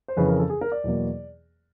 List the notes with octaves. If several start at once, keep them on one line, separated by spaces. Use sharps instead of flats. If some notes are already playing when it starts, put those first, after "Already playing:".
C5
F2 C#3 E3 B4
A#4
A4
G#4
A#4
D5
E2 B2 F#3 A#3